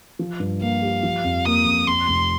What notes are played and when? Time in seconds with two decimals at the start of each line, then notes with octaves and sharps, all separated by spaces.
0.19 F3
0.40 G2
0.61 A#3 F5
0.82 G4
1.03 F3
1.24 F2
1.46 A#3 D#6
1.66 F2
1.87 F2 C6
2.08 F1